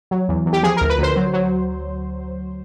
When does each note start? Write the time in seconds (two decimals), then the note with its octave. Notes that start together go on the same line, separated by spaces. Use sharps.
0.11 F#3
0.29 E2
0.46 E2
0.53 G4
0.63 F3 G#4
0.77 A#4
0.81 D2
0.90 B4
0.98 D2 C5
1.16 F#3
1.33 F#3